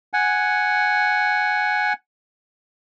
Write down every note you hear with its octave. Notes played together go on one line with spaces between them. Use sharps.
F#5 G#5